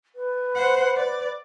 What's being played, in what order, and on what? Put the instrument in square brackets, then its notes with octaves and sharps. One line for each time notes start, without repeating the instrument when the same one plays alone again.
[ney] B4
[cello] C5 F#5
D5